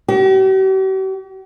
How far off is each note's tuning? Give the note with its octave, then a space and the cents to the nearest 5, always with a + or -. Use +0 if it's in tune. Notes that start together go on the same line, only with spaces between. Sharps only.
G4 -45